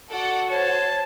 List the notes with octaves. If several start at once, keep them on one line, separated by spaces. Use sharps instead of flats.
F#4 A4 D5 F#5
C5 C#5 A5